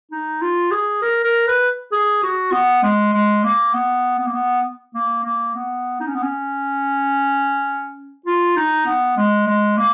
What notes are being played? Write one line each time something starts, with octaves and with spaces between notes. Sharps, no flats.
D#4
F4
G#4
A#4
A#4
B4
G#4
F#4
B3
G#3
G#3
A#3
B3
B3
A#3
B3
A#3
A#3
B3
D#4
C#4
B3
C#4
F4
D#4
B3
G#3
G#3
A#3